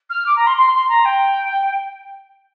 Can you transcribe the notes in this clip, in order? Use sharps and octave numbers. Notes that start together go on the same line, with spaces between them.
F6
D6
A#5
C6
C6
C6
A#5
G5